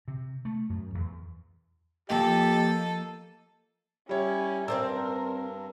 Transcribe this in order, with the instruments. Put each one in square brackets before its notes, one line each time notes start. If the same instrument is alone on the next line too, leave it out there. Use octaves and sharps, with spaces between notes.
[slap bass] C3
A3
F#2
E2
[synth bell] F3 A#3 D#5 [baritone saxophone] G4 [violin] A4
[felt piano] G3 C#5 [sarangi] C#4 [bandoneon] E4
[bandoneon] G2 [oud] C4 C5 D5 [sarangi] A#4 [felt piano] E6